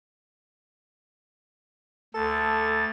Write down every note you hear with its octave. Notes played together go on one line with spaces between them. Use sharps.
D2 A4 A6